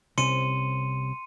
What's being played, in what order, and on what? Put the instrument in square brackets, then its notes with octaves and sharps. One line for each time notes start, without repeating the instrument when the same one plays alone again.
[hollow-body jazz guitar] C2 C3 C#4 [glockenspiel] C6 C#7 D#7